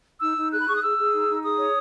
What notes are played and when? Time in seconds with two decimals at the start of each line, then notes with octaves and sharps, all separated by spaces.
0.21 D#4 E6
0.37 D#4
0.52 G#4 F#6
0.61 B5
0.68 G#4 C#6
0.76 D#6
0.82 G#4 E6
0.98 G#4
1.14 D#4
1.29 D#4
1.44 G#4 D#6
1.59 C#5